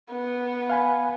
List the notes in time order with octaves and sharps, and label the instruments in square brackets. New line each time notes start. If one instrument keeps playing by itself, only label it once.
[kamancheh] B3
[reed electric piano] F5 G#5 B5